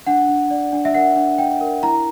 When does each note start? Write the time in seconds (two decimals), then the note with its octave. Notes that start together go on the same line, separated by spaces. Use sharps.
0.06 D4 F#5
0.29 D4
0.51 D5
0.73 D4
0.85 E5
0.94 A#4 F#5
1.16 D4
1.38 D4 G5
1.61 A#4
1.83 E4 A#5